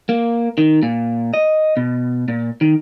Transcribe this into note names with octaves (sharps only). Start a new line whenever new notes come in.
A#3
D#3
A#2
D#5
B2
A#2
D#3